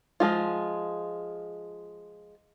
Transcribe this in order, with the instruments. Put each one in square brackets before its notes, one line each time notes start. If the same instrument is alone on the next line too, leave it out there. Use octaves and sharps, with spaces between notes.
[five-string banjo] F3 G#3 F4